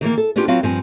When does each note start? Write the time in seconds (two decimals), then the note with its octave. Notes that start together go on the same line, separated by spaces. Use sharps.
0.01 D#3 E3 A3 A#3
0.18 A4
0.36 B3 C#4 D4 F4 G4
0.48 F#3 B3 C4 F4 B4 F5
0.63 G2 F3 C4 G#5